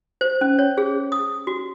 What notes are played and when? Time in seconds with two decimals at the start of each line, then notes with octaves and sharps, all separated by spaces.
0.21 C5
0.41 C#4
0.59 C#5
0.78 G#4
1.12 D#6
1.47 F#4